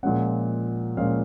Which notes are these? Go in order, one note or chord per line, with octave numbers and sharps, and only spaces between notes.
A#2 F3 G#3 C#4 F#5
A#2 F3 G#3 C#4 F5